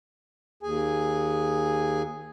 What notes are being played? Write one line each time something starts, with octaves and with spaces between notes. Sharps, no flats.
D#2 G#4 G#5